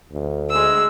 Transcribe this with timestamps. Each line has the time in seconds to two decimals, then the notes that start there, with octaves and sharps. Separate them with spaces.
0.12 D2
0.50 G#3 E6